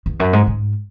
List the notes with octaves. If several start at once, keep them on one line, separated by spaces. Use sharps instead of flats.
E2
F#2
G#2
G#2